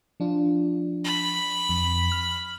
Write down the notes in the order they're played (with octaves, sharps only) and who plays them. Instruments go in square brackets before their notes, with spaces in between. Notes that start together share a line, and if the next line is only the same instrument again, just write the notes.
[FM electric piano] F3 D4 F4
[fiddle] B5
[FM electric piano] F2
F6